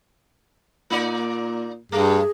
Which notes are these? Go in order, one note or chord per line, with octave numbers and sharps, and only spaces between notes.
A#2 A#3 D#4 D5
G2 A3 G#4